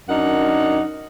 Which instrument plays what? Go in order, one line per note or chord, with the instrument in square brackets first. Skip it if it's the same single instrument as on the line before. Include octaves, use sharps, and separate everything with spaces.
[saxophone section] F#2 D4 D#4 A#4 F#5